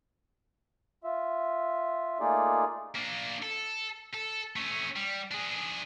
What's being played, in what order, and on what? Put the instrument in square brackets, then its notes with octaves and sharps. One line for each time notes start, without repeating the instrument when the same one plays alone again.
[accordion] F4 E5
A3 A#3 D#4 F4 G#4 D5
[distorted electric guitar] A#3 D4
A4
A4
A3 C#4
G3
D4 G#4